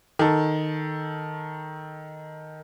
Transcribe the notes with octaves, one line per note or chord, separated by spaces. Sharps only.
D#3 A4